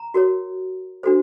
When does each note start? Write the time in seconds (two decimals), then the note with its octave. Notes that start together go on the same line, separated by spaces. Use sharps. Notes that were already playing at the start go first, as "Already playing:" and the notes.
Already playing: A#5
0.14 F#4 A#4 C#5
1.03 D4 F#4 A4 C5